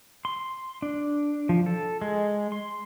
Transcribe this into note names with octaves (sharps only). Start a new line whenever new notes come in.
C6
D4
F3
A4
G#3
C6